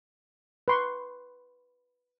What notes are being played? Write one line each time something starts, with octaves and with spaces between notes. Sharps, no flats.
B4 C6 C#6